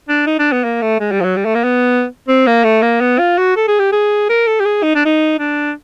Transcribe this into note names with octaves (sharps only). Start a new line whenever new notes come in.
D4
D#4
D4
B3
A#3
A3
G#3
G3
F3
F#3
G3
A3
A#3
B3
C4
A#3
A3
A#3
B3
F4
F#4
A4
G#4
G4
G#4
A#4
A4
G4
G#4
D#4
D4
D#4
D4